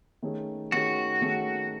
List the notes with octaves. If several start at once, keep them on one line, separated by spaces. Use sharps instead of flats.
D#3 A3 C#4 G#4
D#3 A3 C#4 F#4 G#4
D#3 A3 C#4 G#4